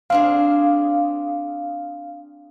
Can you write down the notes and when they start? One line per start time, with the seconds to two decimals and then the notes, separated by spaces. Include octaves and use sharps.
0.10 C4 D4 G#4 F5